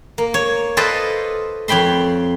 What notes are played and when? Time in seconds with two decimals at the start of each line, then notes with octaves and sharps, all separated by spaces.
0.18 A#3
0.34 C#5
0.77 F4 A4 B4 C5 D5 D#5
1.68 F2 C#5 G5 B5 C6